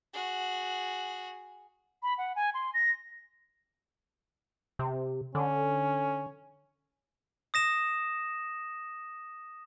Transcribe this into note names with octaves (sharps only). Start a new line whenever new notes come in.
F#4 G#4
B5
F#5
G#5
C6
A#6
C3
D3 C#4
D#6 A#6 E7